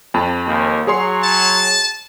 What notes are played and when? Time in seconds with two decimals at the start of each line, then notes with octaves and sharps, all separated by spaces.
0.14 F2 A5 B5
0.46 D#2
0.87 F#3 G#4 C#5 C6
1.23 A5